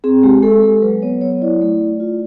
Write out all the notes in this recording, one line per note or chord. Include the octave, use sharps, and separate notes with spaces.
C4 G#4
G#3 G4
G#3 A4
G#3 A4
F#3 B4
B3 C#5
F#3 C#5
C#5
E4 D5
A3
A3
F4